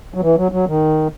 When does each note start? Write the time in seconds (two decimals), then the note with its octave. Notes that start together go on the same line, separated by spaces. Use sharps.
0.14 F#3
0.22 E3
0.37 F#3
0.52 F#3
0.67 D#3